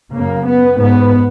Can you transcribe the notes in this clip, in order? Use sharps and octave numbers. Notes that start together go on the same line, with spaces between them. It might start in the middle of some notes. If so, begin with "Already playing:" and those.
F#2 C#3 A#3
B3
G#2 B3